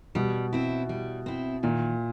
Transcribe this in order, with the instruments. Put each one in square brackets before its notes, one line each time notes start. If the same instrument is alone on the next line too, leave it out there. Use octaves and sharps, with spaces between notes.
[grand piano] B2 [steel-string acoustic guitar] G3
[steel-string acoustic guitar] C4 E4
G3
C4 E4
[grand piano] A#2 [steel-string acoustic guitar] D#3